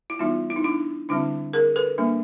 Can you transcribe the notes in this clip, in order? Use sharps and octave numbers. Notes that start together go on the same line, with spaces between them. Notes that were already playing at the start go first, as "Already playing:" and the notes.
E4
E3 G3 B3 D#4 F4
E4
D#4
D4 E4
D3 G3 C4 D4 E4
G#4 A#4
A4 B4
G3 A#3 D4